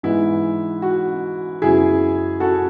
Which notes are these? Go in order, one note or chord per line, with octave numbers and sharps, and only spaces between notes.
G#2 E3 G#3 B3 E4
F#4
F#2 C#3 F#3 B3 E4 G#4
F#4 A4